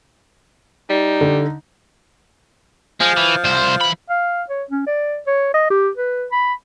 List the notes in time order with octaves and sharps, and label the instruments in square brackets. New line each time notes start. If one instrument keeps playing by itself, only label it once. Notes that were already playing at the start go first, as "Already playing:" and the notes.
[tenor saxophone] G3 [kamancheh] D#4
[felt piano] D3
[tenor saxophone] F3 [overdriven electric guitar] G#3
[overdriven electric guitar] E3
C2 C5
E3 B5
[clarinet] F5
C#5
C#4
D5
C#5
D#5
G4
B4
B5